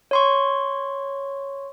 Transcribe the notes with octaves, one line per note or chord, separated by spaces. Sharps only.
C#5 C6 C#6